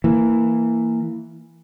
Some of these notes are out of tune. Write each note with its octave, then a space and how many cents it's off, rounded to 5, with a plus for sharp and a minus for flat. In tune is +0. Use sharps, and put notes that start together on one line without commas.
E3 +0 A#3 -15